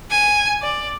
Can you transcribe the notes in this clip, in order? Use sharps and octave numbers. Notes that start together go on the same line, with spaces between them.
G#5
D5